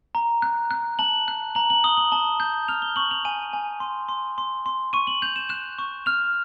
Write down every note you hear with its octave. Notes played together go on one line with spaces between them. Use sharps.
A#5
F#6
F#6
A5 F#7
F#6
A#5 F#7
F#7
D#6 G7
F#7
A5 G7
G6
F6 F7
G7
C#6 F#7
F7
G#5 D#7
G#5
C6
C6
C6
C6
C#6 D#7
F#7
G6 F7
E7
F#6 E7
C#6
F6 F7